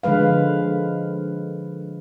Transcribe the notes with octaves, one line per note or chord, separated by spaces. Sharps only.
D3 F3 G#3 B4 F5